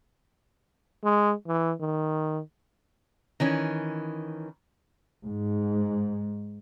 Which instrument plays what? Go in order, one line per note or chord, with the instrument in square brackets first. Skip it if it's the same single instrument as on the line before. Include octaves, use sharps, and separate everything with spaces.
[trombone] G#3
E3
D#3
[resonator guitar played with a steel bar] D#3 E3 C#4
[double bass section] G#2